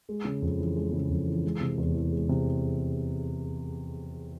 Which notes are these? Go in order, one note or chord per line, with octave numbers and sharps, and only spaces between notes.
G#3
C#3
F2
E3
G#3
C#3
F2
E3
G#3
C3
E2
E3
G#3
C3